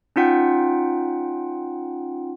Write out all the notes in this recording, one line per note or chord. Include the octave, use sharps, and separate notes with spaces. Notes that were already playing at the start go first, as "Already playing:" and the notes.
C#4 D#4 F4 F#5 G5